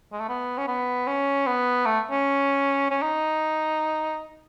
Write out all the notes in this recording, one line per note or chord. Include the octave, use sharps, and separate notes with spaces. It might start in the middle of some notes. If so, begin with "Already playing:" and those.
G#3
A3
B3
C#4
B3
C#4
B3
A3
C#4
C#4
D#4